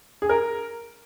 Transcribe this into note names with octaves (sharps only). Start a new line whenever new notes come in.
G#4
A#4